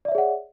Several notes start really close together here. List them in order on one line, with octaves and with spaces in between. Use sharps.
D5 E5 C#5 G#4 F#5